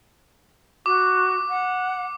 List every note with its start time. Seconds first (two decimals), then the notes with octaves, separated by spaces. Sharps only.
0.86 F#4 D6
1.48 F#5